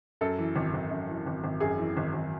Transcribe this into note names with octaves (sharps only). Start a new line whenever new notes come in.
F#2 A4
E3
G#1
G#1
F#2
E3
G#1
G#1
F#2 G#4
E3
G#1
G#1